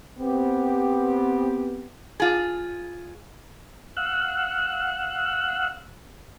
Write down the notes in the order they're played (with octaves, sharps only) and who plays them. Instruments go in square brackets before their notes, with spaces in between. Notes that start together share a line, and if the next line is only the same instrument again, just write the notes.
[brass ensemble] B3 C4 G4
[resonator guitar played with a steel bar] F4 G#4
[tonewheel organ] F5 F#5 E6 F#6